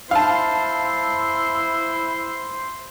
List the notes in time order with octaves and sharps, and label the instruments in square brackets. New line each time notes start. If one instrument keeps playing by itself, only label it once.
[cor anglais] E4 [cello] C5 [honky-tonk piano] F5 A5